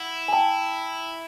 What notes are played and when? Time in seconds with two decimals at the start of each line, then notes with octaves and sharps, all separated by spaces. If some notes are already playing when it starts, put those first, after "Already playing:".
Already playing: E4 F#5
0.28 G#5
0.33 G5 A5